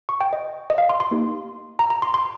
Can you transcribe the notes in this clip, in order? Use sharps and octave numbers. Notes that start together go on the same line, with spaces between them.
C#6
G5
D#5
D#5
F5
C6
C6
A#3 D#4 G4
A#5
A#5
C6
C6